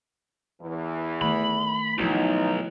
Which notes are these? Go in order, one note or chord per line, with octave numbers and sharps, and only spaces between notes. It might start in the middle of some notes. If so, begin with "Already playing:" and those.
E2 E3
D#3 A3 B5
B1 F3 D#4 E4 F#4